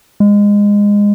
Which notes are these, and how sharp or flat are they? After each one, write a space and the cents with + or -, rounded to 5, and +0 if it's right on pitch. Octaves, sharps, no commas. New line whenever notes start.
G#3 -20